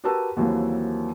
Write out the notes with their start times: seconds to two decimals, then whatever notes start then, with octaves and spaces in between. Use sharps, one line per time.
0.04 F#4 G4 A#4 B4 A5 E6
0.37 D#2 E3 F#3 G3 A#3 C4